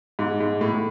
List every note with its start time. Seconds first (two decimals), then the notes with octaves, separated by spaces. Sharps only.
0.19 G#2
0.40 G#2
0.61 A2
0.73 A2